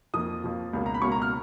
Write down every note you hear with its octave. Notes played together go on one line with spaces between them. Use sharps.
F2 F3 A#3 D#6
F2 F3 A#3
C#2 B2 A#3 C#4
A#5
B5
C#2 B2 A#3 C#4 C#6
A#5
F6